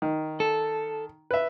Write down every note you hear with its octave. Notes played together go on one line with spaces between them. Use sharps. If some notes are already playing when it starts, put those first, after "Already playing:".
D#3
A4
B4 E5